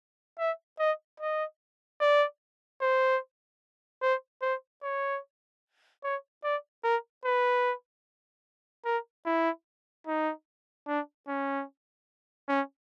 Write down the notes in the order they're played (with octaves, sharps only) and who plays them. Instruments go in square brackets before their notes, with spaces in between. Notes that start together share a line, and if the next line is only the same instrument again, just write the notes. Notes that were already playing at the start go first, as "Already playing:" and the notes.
[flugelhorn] E5
D#5
D#5
D5
C5
C5
C5
C#5
C#5
D5
A#4
B4
A#4
E4
D#4
D4
C#4
C#4